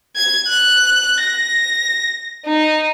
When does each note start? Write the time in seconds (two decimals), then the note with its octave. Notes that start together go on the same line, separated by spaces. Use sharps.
0.16 G#6
0.48 F#6
1.21 A#6
2.46 D#4